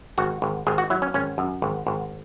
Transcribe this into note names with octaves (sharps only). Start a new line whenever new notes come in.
G#1 F#4
G#1
G#1 G#4
F#4
F#3 E4
C#4
G#1 C#4
F#2
G#1
G#1